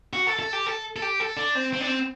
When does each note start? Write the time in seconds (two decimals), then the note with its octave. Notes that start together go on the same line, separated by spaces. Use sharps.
0.13 F#4
0.27 A4
0.39 A4
0.53 G4
0.66 A4
0.96 A4
1.02 G4
1.20 A4
1.37 D4
1.55 C4
1.73 C4
1.81 D4
1.87 C4